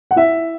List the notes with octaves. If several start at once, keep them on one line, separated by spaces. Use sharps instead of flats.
F#5
E4 E5